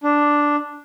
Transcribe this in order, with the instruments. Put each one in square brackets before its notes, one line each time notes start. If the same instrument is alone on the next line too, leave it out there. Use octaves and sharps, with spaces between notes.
[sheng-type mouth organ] D4